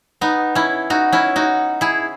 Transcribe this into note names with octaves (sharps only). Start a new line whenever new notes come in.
B3 D#4
C#4 E4
D#4 F#4
C#4 E4
D#4 F#4
E4 G#4